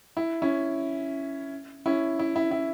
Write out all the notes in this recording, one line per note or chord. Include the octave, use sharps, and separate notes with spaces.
E4
C#4 E4
C#4 E4
E4
E4
E4